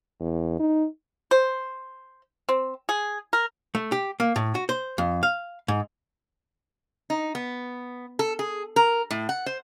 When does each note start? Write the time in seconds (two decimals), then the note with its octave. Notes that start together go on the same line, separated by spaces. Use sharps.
0.20 E2
0.60 D#4
1.31 C5
2.49 C4
2.89 G#4
3.33 A#4
3.75 A3
3.92 G4
4.20 A#3
4.36 A2
4.55 F#4
4.69 C5
4.98 F2
5.23 F5
5.68 G#2
7.10 D#4
7.35 B3
8.19 A4
8.39 G#4
8.76 A#4
9.11 A2
9.29 F#5
9.46 C5